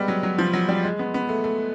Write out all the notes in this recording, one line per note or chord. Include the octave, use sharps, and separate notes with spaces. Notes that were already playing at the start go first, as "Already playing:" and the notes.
Already playing: G3 G#3 B3
F#3
F#3
F3
F#3
G3
G#3
B3
B3
A3
A3